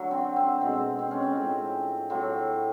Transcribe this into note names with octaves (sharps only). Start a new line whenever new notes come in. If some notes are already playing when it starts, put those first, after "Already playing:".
Already playing: D3 F#3 A3
C4
C4
B2 G#3 C4
C4
C#4
C4
A2 F3 A3
A2 F#3 A3 C4